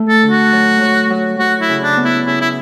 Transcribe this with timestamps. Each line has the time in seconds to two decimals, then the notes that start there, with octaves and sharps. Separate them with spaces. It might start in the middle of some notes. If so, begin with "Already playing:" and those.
Already playing: A3
0.08 A4
0.23 D3
0.30 F#4
0.52 F#3
0.81 F#3
1.10 F#3
1.39 F#3 F#4
1.61 E4
1.69 C#3
1.83 D4
1.97 B3
2.04 E4
2.26 C#3 E4
2.41 E4